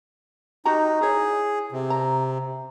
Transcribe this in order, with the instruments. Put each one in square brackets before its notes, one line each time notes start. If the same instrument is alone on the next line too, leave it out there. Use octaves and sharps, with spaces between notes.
[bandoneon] D#4 [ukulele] F#4 G4 A#5
[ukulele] E4 C#5 [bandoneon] G#4
[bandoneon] C3
[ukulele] A#5